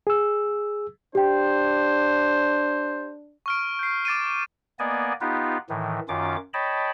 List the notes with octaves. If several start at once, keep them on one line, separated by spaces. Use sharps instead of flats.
G#4 E6
D4 G4 C5 G5
C#6 F6 D7
G6 C7
D6 A6 D7 D#7
A#3 B3 D5 D#5 G#5
B3 D#4 F4 G4 B4
A2 D#3 E3
F#2 D#3 C#4 F4 D6
C#5 D#5 G5 A5 B5